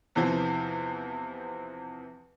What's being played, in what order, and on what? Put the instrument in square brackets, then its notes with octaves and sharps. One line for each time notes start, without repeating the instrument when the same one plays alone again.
[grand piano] E2 C3 E3 F3